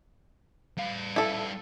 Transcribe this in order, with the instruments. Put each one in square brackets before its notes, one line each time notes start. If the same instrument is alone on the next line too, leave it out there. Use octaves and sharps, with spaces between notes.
[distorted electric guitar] G3 F5
[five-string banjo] E4 A4